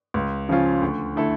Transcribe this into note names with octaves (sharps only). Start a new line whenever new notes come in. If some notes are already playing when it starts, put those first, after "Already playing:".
C#2
C#3 F3 C#4 F4
D2
D3 A3 E4 A4